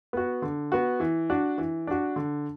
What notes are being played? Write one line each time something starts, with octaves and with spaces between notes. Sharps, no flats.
B3 F#4
D3
B3 F#4
E3
D4 F#4
E3
D4 F#4
D3